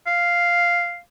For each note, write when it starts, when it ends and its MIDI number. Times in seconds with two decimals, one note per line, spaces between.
0.07 0.99 77